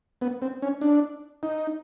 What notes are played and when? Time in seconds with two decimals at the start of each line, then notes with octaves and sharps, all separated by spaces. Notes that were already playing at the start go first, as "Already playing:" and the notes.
0.21 B3
0.42 C4
0.62 C#4
0.81 D4
1.43 D#4